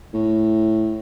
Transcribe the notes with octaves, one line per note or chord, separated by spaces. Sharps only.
A2